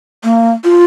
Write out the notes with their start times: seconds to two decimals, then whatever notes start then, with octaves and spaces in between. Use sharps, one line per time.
0.24 A#3
0.64 F4